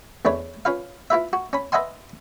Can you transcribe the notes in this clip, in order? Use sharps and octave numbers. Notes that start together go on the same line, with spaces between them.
E2 A3 D4 B4 C#5
C#4 F4 B4 F5
E4 F4 B4 E5
F#4
C#4 B5
B4 D#5 E5 F#5 G#5 C6